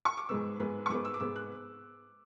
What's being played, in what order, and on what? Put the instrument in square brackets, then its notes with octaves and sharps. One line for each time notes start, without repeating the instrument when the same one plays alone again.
[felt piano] C#6
D6
G#2 G#3 B3 E6
G#2 G#3 B3
C#6
G#2 G#3 B3 D6
E6
D6
G#2 G#3 B3 E6
F#6